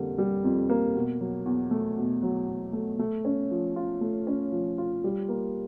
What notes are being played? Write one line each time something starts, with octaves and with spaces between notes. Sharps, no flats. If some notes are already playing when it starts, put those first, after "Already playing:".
Already playing: F2 D3 G3 A#3
G3
F2
A#3
B2
F#3
E2
A3
B2
F#3
E2
A3
A3
C#4
F3
F4
A3
C#4
F3
F4
G3
A#3